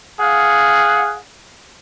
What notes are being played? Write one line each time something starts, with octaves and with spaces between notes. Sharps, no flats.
G#4 F5 F#5